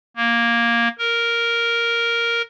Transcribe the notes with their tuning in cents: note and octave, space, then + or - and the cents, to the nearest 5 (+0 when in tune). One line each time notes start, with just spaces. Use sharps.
A#3 +5
A#4 +0